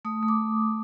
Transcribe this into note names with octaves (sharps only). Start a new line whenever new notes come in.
A3 D#6
A3
D6